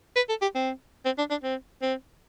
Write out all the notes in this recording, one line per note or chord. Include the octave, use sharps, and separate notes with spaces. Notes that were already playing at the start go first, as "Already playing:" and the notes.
B4
A4
G4
C4
C4
D4
D4
C4
C4